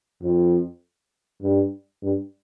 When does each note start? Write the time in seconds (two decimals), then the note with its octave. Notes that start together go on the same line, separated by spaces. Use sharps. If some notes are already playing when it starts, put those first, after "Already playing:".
0.22 F2
1.42 G2
2.02 G2